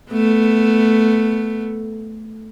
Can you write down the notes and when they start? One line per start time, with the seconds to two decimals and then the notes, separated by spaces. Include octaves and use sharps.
0.11 A3 B3